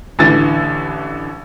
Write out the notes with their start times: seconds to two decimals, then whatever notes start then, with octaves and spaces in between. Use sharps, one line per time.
0.19 A1 D3 E3 A6